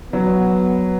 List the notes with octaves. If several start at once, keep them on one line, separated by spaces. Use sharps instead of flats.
F#3 B3